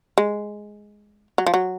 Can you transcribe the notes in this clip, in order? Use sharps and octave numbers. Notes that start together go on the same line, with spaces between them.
G#3
F#3
F3
F#3